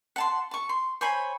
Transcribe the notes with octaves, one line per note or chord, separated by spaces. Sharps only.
F#5 A5 C6
A5 C#6
C6
C5 C#5 G#5 B5